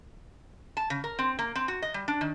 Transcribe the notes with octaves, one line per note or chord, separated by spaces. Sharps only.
A5
C#3
A#4
C4
A#3
C4
F#4
D#5
G3
D4
D#3